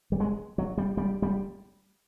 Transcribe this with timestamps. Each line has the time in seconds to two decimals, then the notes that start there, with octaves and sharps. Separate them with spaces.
0.12 G3
0.20 G#3
0.58 F#3
0.78 G3
0.97 G3
1.22 G3